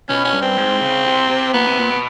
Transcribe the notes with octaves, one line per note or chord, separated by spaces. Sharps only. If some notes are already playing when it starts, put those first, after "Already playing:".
B2 C#4
C#4
G2
C4
G#2
C#3
C3
C3
A#2 B3
C3
A#2
B2